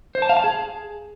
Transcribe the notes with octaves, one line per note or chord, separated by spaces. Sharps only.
C5
A5
F5
A5
G#4